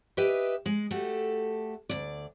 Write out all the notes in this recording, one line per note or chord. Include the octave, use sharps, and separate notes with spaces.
G4 B4 D#5 E5 G5
G#3
A3 F#4 G4 A4
D2 A#2 D5